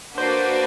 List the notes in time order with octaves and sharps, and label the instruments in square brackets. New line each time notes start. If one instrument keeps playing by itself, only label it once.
[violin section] A#3 D4 F#4 B4 D5 [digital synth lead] C5